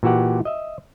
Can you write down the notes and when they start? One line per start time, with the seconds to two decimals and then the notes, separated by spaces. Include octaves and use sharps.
0.03 A#2 E3 F#4 G4 F#5
0.45 D#5 E5